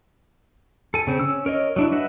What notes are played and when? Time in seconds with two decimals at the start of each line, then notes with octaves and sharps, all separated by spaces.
0.94 A4 G#5
1.07 C#3 C4
1.19 C#4 E6
1.46 A#4 C#5 D#5
1.76 F#3 D4 E4
1.92 B4 D#5 E5 F#5